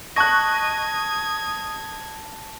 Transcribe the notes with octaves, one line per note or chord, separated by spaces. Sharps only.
D#5 A5 C#6 F#6 G#6 A#6